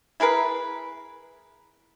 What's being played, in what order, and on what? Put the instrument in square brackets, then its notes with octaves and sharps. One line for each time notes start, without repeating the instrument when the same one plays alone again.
[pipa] E4 G#4 A#4 B4